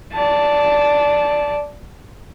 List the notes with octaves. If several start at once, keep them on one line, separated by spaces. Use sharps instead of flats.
D5 A5